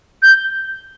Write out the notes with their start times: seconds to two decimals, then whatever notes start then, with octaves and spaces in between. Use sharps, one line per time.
0.23 G6